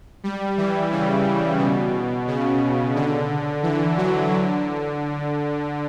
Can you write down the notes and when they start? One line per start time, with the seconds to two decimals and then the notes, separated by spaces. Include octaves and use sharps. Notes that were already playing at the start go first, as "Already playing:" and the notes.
0.24 G3
0.57 E3
0.91 C#3
1.59 B2
2.27 C#3
2.95 D3
3.63 E3
3.97 F#3
4.31 D3